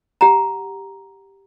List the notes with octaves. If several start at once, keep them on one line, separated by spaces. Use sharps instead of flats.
G4 F#5 A#5